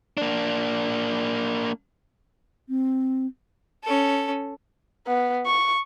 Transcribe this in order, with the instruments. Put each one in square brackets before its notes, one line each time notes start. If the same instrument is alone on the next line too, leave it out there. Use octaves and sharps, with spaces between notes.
[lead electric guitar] A#3 D4
[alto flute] C4
[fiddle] C#4 A4
[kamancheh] B3
C#6